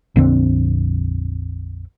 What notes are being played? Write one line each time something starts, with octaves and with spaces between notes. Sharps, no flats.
A#1 F2 D3 C4